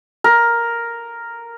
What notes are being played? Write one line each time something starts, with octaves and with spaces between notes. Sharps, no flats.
A#4